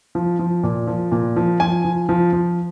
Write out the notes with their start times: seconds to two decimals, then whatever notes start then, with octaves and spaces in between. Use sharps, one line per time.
0.15 F3
0.39 F3
0.63 A#2
0.87 F3
1.12 A#2
1.36 F3
1.60 F3 G#5
1.85 F3
2.09 F3
2.33 F3